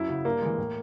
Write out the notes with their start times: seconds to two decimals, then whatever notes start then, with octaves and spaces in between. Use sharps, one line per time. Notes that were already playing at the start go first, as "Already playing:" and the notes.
Already playing: F#2 E4
0.08 C#3 F#3
0.25 G2 A#3
0.42 E3 G#3
0.58 A2